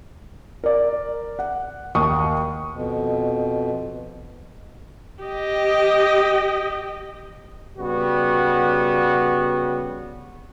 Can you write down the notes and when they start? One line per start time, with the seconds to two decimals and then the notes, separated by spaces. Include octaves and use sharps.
0.64 A#4 D5
1.39 F#5
1.95 D#2 C#6 D#6
2.73 F2 B2
5.23 G4 D#5
7.79 C#3 G3 B3 F#4